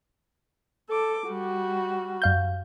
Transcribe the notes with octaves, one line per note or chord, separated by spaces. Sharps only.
A4 D6
G3 F#4
F#2 F5 G6